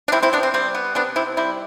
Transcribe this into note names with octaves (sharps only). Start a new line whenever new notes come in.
D4
C3 C4 E4
C4 E4
C3 B3 D4
C4
G3 C4
B3
C3 B3 D4
C3 C4 E4
G3 C4 E4